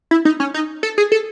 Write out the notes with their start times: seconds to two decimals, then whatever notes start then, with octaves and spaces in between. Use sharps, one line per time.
0.11 E4
0.25 D#4
0.40 C#4
0.54 D#4
0.83 A4
0.98 G#4
1.12 A4